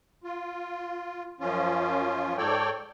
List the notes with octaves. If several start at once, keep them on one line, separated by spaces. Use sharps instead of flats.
F4
F#2 F3 C#4 F4
G#2 A4 C#5 D5 G5